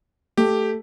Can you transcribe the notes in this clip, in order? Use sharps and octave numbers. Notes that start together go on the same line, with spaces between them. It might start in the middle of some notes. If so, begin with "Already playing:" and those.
A3 G4